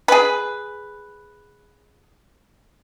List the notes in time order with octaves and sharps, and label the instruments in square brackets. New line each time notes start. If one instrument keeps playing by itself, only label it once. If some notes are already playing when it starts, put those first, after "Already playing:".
[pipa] G#4 B4